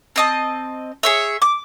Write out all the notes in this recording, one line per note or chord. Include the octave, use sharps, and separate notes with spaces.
C4 D#5 A5
G#4 C#5 E5
D6